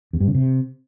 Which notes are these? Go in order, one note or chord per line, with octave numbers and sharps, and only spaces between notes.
E2
G2
C#3
C3